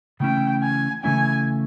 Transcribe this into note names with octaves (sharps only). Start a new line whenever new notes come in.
C#3 E3 A3 C#4 E4 G5
G#5
C#3 E3 A3 C#4 E4 G#5